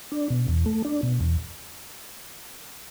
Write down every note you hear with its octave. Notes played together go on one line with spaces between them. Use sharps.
D4
B2
E2
A3
D4
B2
E2